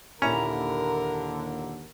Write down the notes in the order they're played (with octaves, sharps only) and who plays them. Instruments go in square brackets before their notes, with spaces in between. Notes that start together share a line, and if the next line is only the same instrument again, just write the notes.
[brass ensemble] D#2 D3 [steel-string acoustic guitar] A#2 E4 A#5 [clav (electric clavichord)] C#4 [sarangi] A#4